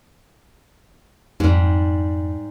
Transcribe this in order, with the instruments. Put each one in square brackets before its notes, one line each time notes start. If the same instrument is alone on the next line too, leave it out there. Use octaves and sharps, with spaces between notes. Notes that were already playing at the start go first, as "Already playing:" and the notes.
[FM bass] F2 [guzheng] G#2 G3